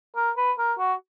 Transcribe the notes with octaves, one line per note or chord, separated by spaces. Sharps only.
A#4
B4
A#4
F#4